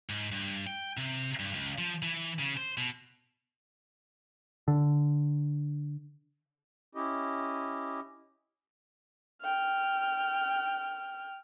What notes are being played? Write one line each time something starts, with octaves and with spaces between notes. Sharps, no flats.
G#2
G2
G5
C3
G2
C#2
F3
E3
C#3
C5
B2
D3
C#4 E4 G4 D#5
G5 F6